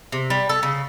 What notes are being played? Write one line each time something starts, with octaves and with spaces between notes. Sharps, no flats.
C3
G3
A4
C#3